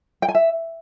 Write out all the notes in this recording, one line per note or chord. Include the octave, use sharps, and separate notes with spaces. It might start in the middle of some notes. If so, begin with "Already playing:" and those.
G5
G#5
E5